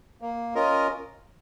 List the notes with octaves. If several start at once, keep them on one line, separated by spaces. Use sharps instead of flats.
A#3
C#4 F4 A#4 D#5